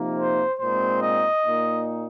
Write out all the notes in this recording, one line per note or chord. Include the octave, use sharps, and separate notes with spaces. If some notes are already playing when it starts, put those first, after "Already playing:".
Already playing: C3 F3 A#3 D#4
C5
A#2 G#3 C4 D#4 C5
D#5
A#2 A#3 D#4